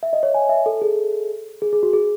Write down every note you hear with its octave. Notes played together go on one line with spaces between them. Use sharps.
E5
D#5
C#5
G#5
E5
A4
G#4
G#4
G#4
F#4
G#4